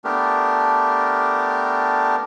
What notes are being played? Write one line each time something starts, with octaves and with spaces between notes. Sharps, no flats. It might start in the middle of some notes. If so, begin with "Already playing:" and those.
A3 B3 D4 G4 A#4